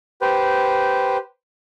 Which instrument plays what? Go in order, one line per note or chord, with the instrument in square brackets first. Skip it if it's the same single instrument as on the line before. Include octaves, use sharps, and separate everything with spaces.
[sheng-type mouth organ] G4 B4 C5